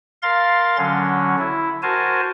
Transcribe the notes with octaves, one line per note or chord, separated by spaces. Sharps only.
A#4 F5 C6 A6
D3 F#3 C#4
E4
F#4 A#4 C5 G#5 A5